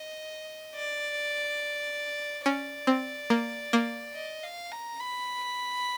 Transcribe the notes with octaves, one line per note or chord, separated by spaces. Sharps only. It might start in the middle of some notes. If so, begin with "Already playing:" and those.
Already playing: D#5
D5
C#4 D5
C4
A#3
A#3
D#5
F5
A#5
B5